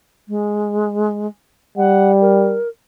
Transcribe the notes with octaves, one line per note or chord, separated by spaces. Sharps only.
G#3
G3 F#5
A#4